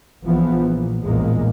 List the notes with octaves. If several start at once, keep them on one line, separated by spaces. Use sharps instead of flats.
A#1 E3 F3 B3
A#2
A#1 E2 A2 G#3 A#3